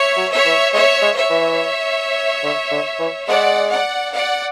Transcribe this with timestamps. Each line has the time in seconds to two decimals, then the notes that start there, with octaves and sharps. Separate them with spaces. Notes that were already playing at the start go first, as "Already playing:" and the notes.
Already playing: C#5 E5
0.17 F#3
0.32 C#5 E5
0.45 E3
0.73 G#3 C#5 E5
1.02 G#3
1.16 C#5 E5
1.30 E3
2.43 D3
2.71 D3
2.99 E3
3.27 G#3 D5 F#5
3.70 D5 F#5
4.12 D5 F#5